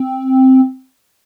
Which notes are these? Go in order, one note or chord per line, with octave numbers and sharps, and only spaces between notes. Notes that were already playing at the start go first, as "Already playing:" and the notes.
Already playing: C4